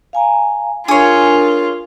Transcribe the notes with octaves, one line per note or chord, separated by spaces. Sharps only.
F5 G#5 A#5
D4 F4 G#4 A#4 C#5